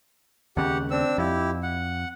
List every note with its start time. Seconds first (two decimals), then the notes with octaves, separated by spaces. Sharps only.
0.57 D#2 C#3 G4 F#5
0.91 C4 D4 E6
1.18 F2 E4 G4
1.63 F#5